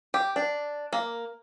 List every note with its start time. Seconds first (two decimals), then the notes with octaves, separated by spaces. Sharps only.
0.14 G4
0.36 D4
0.93 A#3